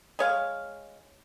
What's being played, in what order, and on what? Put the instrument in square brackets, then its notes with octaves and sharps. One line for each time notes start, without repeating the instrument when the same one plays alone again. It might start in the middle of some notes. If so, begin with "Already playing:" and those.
[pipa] G#3 C#5 F5